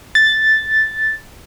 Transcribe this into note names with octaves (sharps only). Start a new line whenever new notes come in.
A6